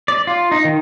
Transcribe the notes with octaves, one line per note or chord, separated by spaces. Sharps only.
D5
F4
D#4
D#3